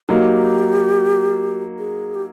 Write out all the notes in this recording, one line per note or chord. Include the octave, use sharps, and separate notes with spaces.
F#3 A#3 D#4 G4
G#4
G4